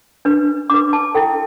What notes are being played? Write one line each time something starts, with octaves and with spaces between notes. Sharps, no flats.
D4 B4
D4 B4 D6
A5
E4 A4 G5